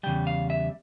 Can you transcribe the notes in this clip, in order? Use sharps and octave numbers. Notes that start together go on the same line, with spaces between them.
E2 C#3 G3 G5
F5
E5